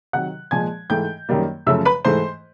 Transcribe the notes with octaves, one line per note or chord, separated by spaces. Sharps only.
C3 D#3 F#3 F#5 F#6
A#2 F3 G#3 G#5 G#6
G#2 E3 A3 G5 G6
F#2 D#3 G3 A#3
F#2 C#3 F3 A3 E5 E6
B4 B5
G#2 E3 A3 C5 C6